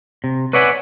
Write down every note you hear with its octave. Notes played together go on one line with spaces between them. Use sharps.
C3
B4 C#5 D5 E5 F#5 G#5